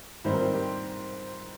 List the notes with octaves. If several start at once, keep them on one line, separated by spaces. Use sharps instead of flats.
G#2 D#3 G3 C4 C5
A#4
C5
G4